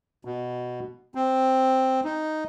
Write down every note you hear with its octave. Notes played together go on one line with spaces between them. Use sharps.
B2
C4
D#4